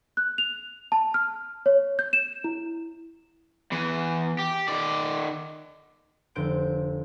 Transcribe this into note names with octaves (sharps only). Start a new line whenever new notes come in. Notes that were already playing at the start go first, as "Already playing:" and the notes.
F#6
F7
A5
F6
C#5
G6
E7
E4
E2 E3
G4
D#3 D5
F1 D3 C4 G6 D7